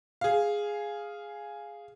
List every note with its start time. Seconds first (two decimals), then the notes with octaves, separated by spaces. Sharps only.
0.21 G#4 F5